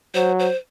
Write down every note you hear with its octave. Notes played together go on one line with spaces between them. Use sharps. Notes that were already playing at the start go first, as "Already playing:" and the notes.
F#3 C5
C5